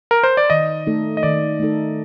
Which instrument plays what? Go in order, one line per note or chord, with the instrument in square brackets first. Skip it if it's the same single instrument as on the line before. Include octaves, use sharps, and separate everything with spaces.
[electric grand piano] A#4
C5
D5
[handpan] D#3 [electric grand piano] D#5
[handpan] A3 D#4 A4
[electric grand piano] D#5
[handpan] D#3 [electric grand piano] D5
[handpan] A3 D#4 A4